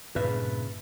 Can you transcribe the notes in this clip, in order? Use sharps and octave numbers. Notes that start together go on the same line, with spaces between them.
G2 A#2 C#3 B4 E5